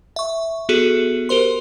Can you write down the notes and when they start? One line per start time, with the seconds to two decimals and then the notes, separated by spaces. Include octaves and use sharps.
0.16 E5 C#6
0.69 B3 F#4 G#4 A4
1.29 G4 A#4 C5 C6